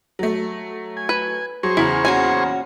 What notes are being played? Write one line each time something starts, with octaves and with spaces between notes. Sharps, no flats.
F#3 A3
G#5
B4
F#3 G#4 C5 C#6
E2 C#3 E4 A#5
A#2 C#4 F#4 G#5